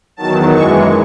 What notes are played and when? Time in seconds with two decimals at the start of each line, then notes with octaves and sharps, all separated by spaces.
0.16 E2 D#3 F#3 A5
0.51 F#2 E3 G#3 C#6